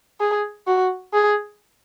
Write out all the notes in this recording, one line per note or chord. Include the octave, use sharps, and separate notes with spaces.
G#4
F#4
G#4